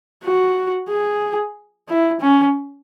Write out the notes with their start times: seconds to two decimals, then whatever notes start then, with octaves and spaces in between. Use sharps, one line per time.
0.24 F#4
0.89 G#4
1.89 E4
2.20 C#4